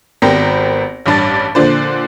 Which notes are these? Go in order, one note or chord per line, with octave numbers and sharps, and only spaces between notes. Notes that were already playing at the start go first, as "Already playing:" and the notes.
G#1 B3 C4 G4 A#4 A#6
A1 G2 D4 A5 A6
A#2 D3 F3 D4 C5